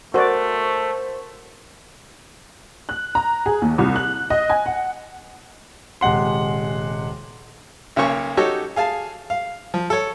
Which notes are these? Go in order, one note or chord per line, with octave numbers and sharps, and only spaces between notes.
A3 F#4 A#4 C5 D5 F#5 C#6
F#6
A#5
G#4
D#2
C2
F#6
D#5
G#5
F#5
D#1 C3 G#3 F#5 C6
B1 C#3 A#3 C#4 C#6
D#4 F#4 G4 A4 C#5
G#4 F5 G#5 A5
F5
F3
A4 C#5